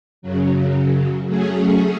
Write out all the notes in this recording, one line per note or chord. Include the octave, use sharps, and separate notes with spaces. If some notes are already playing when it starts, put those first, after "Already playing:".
F#2 C#3 F#3
F#3 A3 C#4 G#4